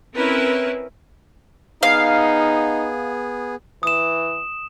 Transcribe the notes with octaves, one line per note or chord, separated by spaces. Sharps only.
C4 C#4 E4 A#4 B4
B3 D#4 G#4 F5
E3 D#6 E7